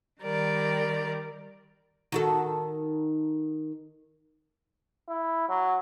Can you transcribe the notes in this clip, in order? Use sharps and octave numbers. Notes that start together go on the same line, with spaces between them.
D#3 G3 A#4 D5
D#3 F#4 A4
E4
F#3